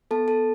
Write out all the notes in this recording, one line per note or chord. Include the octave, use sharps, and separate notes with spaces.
B3 A4 A5
A4 A5